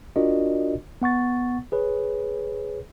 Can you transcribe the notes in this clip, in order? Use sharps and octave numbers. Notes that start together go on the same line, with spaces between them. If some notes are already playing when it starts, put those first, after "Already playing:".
D4 F4 F#4 A#4 D5 D#5
B3 F#5 C#6 A6
G#4 B4 C#5